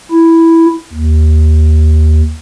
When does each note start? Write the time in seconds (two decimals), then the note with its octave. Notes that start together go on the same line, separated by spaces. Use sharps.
0.11 E4
0.93 D#2